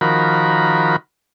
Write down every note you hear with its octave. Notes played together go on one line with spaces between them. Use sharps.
D#3 F3 F#4 A#4 B5